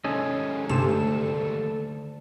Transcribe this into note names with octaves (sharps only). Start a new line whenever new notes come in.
D#2 G#2 C#4 A4 D#5
D2 G2 C3 A4 E7